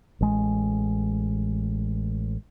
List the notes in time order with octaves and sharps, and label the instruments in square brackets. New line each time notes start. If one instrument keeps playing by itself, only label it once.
[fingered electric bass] A1 G#3